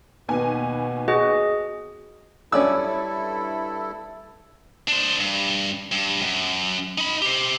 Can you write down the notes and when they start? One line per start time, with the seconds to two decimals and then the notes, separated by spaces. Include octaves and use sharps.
0.29 D#2 B2 B3 G#5
1.08 F#4 G#4 D#5
2.52 G2 C#4 E4 A4 D5 E6
4.88 D4 C5
5.20 G2
5.92 G2
6.21 F#2
6.98 D#4 B5
7.22 G4 C5